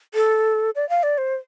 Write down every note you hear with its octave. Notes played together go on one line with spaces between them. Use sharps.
A4
D5
F5
D5
C5